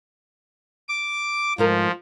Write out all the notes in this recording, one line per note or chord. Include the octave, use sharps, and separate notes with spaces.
D6
G#2 F3 F4 A#4